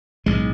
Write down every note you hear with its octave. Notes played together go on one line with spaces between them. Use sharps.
B1 A2 G#3